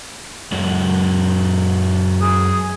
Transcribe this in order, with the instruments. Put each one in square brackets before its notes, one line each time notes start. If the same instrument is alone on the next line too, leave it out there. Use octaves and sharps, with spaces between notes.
[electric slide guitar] F#2 F#3 G#3
[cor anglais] G#4